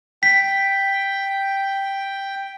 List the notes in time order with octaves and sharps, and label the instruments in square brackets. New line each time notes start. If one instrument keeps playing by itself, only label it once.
[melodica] G5 [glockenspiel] B6